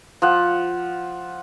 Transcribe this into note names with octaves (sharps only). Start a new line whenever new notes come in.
F3 F#5